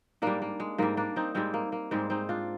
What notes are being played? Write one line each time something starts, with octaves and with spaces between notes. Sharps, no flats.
G#2 G3 A#3 D4
A#3
G#3
G#2 G3 A#3
A#3 D4
C4 D#4
G#2 G3 G#3 C4
A#3
A#3
G#2 G3 G#3 C4
C4 D#4
D4 F4